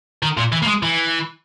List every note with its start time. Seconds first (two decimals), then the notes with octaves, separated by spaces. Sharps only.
0.23 D#3
0.37 A#2
0.52 E3
0.63 A#3
0.67 G#3
0.83 E3